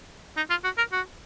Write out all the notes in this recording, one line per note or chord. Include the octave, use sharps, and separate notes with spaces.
D#4
F4
F#4
A#4
F#4